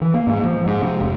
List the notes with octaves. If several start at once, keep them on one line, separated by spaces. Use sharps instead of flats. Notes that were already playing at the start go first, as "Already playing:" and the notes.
E3
A#3
G#2
F3
G#2
C3
F1